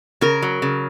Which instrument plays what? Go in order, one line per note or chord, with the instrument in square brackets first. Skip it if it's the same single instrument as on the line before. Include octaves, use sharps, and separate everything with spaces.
[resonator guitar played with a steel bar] C#3 [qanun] A#4
[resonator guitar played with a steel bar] F#3
C#3